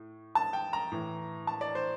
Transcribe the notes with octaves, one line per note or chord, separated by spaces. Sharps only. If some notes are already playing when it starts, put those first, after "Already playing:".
Already playing: A2
A5
G5
A#5
A2 E3
A5
D5
C5